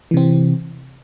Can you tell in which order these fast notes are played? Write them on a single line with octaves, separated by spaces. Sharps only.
E3 C3 C4